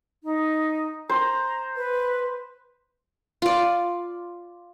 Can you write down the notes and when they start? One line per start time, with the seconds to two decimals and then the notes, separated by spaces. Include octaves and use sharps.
0.24 D#4
1.09 C5 A#5
1.76 B4
3.42 F4 D5